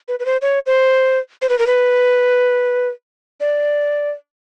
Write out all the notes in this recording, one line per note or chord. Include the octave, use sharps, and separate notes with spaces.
B4
B4
C5
C#5
C5
C5
B4
A#4
B4
D5